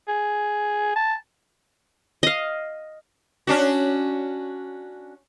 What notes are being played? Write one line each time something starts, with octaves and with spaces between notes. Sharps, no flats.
G#4
A5
D#5 F5
C#4 D4 F#4